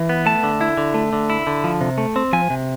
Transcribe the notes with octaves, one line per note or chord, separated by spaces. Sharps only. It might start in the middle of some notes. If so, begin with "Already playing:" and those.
Already playing: E3
B3
A3 A5
D3
E4
D3
A3
D3
E4
D3
F3
C3
A3
C4
F3 G#5
C3